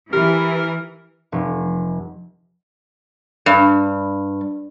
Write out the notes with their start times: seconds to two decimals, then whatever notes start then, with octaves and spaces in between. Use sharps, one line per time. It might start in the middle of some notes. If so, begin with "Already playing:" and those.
0.13 E3 G4 A#4
1.32 F1
3.46 G2